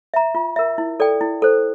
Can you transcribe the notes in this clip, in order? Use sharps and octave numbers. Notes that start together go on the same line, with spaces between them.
E5 A#5
F4
A#4 E5
E4
A4 D5 G5
E4
A4 C5